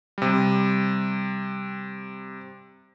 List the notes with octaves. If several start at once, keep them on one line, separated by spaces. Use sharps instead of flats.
C3 G3